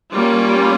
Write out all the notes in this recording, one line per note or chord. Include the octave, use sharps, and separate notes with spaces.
G3 A#3 C#4 F4